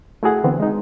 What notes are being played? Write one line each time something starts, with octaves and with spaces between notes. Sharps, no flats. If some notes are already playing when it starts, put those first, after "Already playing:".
A3 E4 F#4 G#4 F#5
D3 E3 B3 C4
G#3 D#4